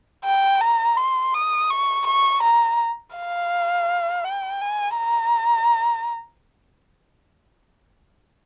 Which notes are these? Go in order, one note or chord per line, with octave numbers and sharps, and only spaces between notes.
G5
A#5
C6
D#6
C#6
C#6
A#5
F5
G5
G#5
A#5